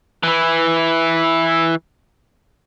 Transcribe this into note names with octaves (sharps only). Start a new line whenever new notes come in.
E3 E4